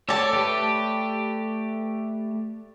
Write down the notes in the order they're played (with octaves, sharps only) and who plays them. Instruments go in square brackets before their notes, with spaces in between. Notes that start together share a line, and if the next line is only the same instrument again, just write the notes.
[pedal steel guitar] A4 [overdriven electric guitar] C#5 [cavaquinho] D5 A5
[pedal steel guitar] A3 B4 [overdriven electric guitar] G4